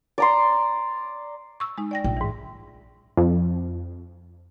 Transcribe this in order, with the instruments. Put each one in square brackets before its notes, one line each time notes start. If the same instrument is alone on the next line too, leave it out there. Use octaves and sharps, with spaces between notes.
[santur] D5 A#5 C6
[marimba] C#6 E6
G#3 D#4
D5 G5 A#6
[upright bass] A#1 [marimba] G5
[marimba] G#2 E3
[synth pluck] F2